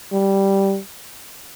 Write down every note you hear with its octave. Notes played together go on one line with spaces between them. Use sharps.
G3